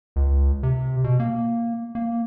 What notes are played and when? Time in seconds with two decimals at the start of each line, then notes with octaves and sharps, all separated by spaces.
0.16 C#2
0.63 C3
1.04 B2
1.20 A#3
1.95 A#3